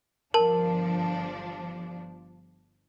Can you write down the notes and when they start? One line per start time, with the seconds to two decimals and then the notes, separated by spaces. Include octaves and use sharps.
0.34 G1 F3 D4 A#4 A5